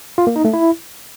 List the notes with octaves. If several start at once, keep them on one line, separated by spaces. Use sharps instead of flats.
F4
A#3
D#4
A3
E4